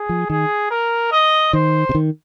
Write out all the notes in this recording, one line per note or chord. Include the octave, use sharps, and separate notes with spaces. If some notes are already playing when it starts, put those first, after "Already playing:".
Already playing: G#4
F3
D#3 G#4
A#4
D#5
D#3 C5
C3
D#3